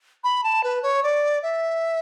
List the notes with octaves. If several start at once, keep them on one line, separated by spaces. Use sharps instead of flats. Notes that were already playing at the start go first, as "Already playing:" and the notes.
B5
A5
B4
C#5
D5
E5